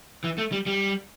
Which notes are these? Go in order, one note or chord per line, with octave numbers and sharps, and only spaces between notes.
E3
A3
G3
G3